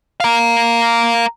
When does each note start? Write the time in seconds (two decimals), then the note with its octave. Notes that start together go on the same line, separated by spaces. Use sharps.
0.20 A#4 F5